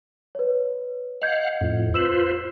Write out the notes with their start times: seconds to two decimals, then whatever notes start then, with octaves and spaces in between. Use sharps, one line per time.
0.35 B4 C#5
1.22 D#5 F5 F#5 G6 G#6
1.61 F2 A2
1.94 F4 B4 C5 E6 E7 F#7